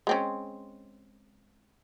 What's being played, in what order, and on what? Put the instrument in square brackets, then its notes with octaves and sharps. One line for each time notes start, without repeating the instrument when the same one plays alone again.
[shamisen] G#3 C4 C#4